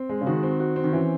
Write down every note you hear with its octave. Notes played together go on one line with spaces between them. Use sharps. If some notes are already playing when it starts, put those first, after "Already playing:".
Already playing: C4
G#3
C#3
D#3 F#4
C4
F#4
C4
D#3
E3 C#4